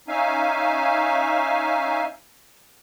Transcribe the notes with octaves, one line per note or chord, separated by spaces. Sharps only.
C#4 D#4 E5 F5 G#5